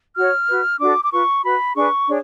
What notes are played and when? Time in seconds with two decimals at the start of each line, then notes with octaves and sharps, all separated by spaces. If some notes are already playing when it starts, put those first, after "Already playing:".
0.17 F#4 C#5 F6
0.49 F#4 B4
0.80 D4 F#4 A4 D6
1.05 D6
1.11 F4 B4 C#6
1.43 F#4 B4 B5
1.75 D4 G#4 B4 C#6
2.07 D4 G#4 C#5